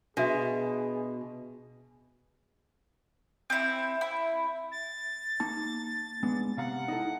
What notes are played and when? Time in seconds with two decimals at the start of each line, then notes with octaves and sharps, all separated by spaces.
0.17 B2 D4 F#4 G#4 E5
3.50 C4 E4
4.01 E4
4.72 A6
5.40 A#3 D#4 A5
6.23 G#3 B3 D4
6.57 C3 F5 F#5 A#5
6.88 D#4 E4 A4